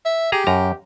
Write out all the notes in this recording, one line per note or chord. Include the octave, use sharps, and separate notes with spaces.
E5
G4 G#4 A#5
F#2 A#5